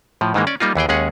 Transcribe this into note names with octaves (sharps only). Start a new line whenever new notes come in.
A2 F3
G#2 D#3 E3 G#3 A#3
C#4 D5
G3 A#3 D#4 F4
D#2 E3 G#4 G5
D#2 G#3 C#4 G#4 F#5